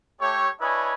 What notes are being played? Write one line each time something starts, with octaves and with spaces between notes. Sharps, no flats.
A3 G4 C#5
D4 E4 B4 C#5 D#5 G#5